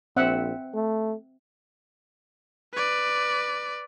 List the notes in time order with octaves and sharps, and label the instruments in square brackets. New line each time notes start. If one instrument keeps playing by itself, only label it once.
[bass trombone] A#1 [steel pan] C4 E5 F#5
[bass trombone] A3
[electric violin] B4 D5